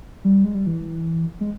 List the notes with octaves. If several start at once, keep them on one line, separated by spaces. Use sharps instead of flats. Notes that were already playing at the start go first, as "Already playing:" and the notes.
G3
G#3
G3
E3
G#3